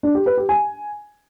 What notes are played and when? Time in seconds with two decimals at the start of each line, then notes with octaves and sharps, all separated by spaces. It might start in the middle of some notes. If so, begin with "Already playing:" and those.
0.03 D4
0.15 G4
0.26 B4
0.37 G4
0.49 G#5